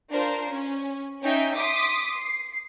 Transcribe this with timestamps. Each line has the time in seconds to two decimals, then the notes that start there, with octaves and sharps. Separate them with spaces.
0.11 D4 F4 A#4 C5
0.50 C#4
1.21 C#4 D#4 E5 G5
1.56 C6 D6 D#6 B6
2.17 C7